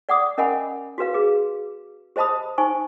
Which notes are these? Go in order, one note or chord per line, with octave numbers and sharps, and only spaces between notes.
D5 F#5 D6 D#6
C#4 A#4 D#5 F#5 G#5 B5
F#4 G4 B4 F5
G#4 B4
G4 C5 D#5 A5 B5 D#6
D#4 C5 G#5 C#6